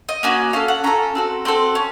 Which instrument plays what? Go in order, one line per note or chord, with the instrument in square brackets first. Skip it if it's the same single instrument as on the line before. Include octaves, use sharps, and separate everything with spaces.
[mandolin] D#5
A#3 C#4 F#4
C#4 A4 F5
F#5
C#4 F4 A4 A#5
C4 F#4 A4
C4 F#4 A4 C6
C#4